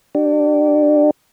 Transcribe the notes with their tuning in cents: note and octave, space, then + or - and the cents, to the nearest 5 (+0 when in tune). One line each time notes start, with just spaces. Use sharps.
D4 +25 G4 -30